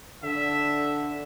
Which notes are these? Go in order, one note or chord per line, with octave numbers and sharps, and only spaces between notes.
D3 E5